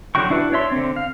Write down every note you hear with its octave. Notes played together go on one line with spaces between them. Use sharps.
D3 F#3 F#4 G5 C#6
D4 E4 F#4 B4
D4 C#5 E5 C6
D3 C4
F5